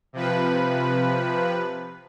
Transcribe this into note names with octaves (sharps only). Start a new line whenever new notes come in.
C3 F3 B4